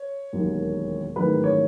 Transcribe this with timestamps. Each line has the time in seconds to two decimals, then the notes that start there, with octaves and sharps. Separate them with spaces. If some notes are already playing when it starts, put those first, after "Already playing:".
Already playing: C#5
0.33 E1 D#2 D#3 F#3
1.16 A1 G#2 D#3 F#3 B4
1.44 C#5